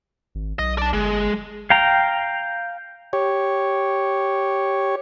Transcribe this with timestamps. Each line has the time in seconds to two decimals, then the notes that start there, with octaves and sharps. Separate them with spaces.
0.35 G#1
0.59 B1 D#5
0.78 D5 A5
0.93 G1 G#3
1.70 F5 G5 A#5
3.13 G4 C#5